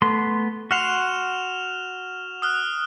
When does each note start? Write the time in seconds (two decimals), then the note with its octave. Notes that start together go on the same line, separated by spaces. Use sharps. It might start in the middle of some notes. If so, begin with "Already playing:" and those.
0.02 A3 B3 C6
0.71 F#4 F#5 C6 F6 E7 F7
2.42 D#6 F6 F#6